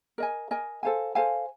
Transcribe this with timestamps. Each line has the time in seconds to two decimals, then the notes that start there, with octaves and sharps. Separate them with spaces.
0.18 A#4 D#5 G#5
0.51 A#4 D#5 G#5
0.83 A4 C5 F5 G#5
1.15 A4 C5 F5 G#5